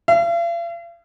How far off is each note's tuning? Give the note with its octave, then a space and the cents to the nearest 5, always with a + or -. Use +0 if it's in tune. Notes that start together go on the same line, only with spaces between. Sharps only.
F5 -45